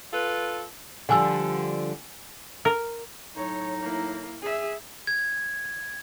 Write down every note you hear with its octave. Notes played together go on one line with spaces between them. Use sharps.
F4 A4 B4
D3 F3 G3 F#5 G#5 E6
A#4
A2 F#3 D#4 C#5
A#3 E4
G#4 E5
G#6